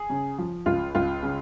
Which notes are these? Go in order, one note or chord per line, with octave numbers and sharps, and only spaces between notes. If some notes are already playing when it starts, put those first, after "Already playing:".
Already playing: G#4
C#3
F3
C#2 F4
C#2 F4
C#3